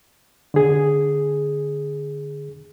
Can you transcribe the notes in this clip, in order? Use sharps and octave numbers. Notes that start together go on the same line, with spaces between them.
D3 G#4